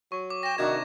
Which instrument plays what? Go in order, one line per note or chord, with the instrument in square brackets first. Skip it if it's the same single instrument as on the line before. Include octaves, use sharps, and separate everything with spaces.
[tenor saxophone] F#3 [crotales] C#6
[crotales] D6
[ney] G5 [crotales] A#6 E7
[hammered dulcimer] C3 D4 D#4 [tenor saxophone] D#3 [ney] F#4 [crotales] G#6